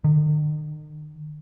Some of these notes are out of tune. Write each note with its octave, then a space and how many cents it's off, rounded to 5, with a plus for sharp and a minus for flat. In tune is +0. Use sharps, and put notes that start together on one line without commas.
D#3 -45